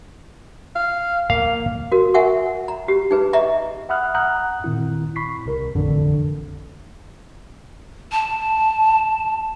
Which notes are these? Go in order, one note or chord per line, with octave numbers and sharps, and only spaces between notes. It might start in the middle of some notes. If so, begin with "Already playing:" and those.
F5
A#3 F5
F#4 A#4
A#4 E5 F#5 G#5 C#6
A#5
G4
D#4 G#4 B4
D#5 E5 A#5 C#6
E5 F#5 B5 D#6 F6 F#6
F#5 A#5 D#6 F#6 G6
A#2 D#3 C4 E4
B5 C#6 B6 C7
C2 C3 A#4
A1 F2 D3
A5